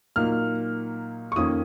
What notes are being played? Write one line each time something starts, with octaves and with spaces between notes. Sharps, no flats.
A#2 F#3 A#3 D#4 F6
C#6
F2 D#3 A#3 C#4 D#6